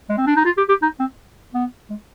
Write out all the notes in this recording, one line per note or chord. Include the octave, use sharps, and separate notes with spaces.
G#3
C4
D4
D#4
F4
G4
G4
D#4
C4
B3
G#3